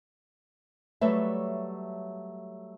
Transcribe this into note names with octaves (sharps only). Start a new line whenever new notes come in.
F#3 G3 A3 B4 C#5 E5